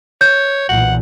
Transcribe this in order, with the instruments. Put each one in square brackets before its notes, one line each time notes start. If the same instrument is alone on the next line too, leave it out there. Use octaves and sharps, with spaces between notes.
[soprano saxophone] C#5 [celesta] G6
[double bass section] B1 A#2 E3 [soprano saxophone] F#5